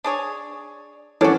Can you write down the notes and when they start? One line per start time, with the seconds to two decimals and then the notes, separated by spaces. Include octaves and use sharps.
0.04 D4 G#4 C#5
1.21 E3 C#4 D4 F#4 A4